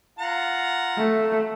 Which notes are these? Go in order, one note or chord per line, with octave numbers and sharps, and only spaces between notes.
F4 F#5 A#5
A3